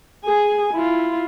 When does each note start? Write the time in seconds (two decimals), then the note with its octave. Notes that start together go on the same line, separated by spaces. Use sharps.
0.25 G#4 G#5
0.73 E4 F4